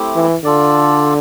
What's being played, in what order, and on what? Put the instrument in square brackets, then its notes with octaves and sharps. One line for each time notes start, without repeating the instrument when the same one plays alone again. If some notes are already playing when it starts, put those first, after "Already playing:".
Already playing: [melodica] A3 C4 E4 G4
[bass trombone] E3
[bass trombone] D3 [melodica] F4 A4 D5